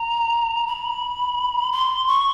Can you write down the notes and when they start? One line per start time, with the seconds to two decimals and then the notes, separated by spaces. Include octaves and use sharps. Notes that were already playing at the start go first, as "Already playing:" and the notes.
Already playing: A#5
0.67 B5
1.72 C6
2.08 C#6